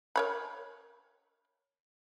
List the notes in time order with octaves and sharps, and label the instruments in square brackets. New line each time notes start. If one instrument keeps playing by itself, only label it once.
[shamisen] A#4 C#5 B5